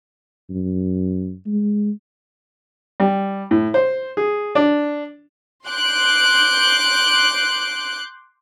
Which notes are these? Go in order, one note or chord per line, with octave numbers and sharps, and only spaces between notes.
F#2
G#3
G3
A2
C5
G#4
D4
C6 D6 F#6 G6 D7